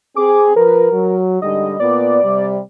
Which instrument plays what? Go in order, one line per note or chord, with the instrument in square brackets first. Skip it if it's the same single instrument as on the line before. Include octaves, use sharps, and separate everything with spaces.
[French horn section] C4 G#4 [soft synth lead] D6
[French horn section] F3 B4 [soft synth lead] A#4
[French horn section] F#3
[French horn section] G#2 D3 G3 [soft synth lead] D#5
[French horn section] A#2 B3 [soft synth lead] D5
[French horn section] C3 G3